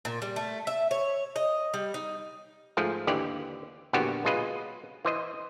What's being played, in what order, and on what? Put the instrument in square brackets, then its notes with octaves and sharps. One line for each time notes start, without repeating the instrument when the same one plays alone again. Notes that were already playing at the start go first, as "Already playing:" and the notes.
[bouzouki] A#2
G3
A3
E5
C#5
D#5
G3
D#4
[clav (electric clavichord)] G#2 F3 A3
D#2 D3 E3 G4 D5
A#1 E2 D3 B3 F#4 G4
B1 G#3 F4 B4 D#5
E3 C5 D#5